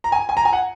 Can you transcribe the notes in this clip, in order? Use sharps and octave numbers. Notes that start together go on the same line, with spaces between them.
A#5
G#5
G#5
A#5
G#5
F#5